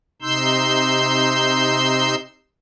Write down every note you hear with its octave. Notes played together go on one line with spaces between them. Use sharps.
C3 D#4 C6 E6 G6